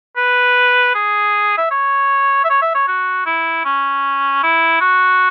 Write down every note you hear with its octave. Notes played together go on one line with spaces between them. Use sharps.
B4
G#4
E5
C#5
E5
C#5
E5
C#5
F#4
E4
C#4
E4
F#4